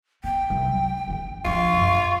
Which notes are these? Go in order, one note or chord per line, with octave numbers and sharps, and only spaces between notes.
B3 G5
C2
F#3
E3 C#4
F3 D4 F4 C#6
F#2